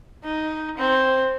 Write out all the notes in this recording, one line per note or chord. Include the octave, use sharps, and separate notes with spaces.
D#4
C4